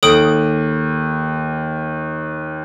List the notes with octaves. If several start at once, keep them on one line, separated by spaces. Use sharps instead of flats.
D#2 A4 D#6 D7